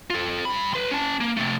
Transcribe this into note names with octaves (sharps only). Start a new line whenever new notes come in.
F4 A4
G2 B5
B4 C6
C#4 A5
A#3
C3 A3